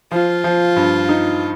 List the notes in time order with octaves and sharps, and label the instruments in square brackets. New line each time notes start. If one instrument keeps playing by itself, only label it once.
[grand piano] F3 [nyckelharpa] F4
[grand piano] F3
G2
D#4